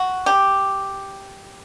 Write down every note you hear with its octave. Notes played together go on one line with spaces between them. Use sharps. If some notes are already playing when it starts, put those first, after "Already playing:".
Already playing: F#4
G4